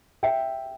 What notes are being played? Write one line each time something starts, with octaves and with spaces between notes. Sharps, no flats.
E5 G5